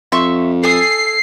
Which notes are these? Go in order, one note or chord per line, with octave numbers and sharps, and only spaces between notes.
F2 E5 C6 C#6
A4 G#5 D#6 C7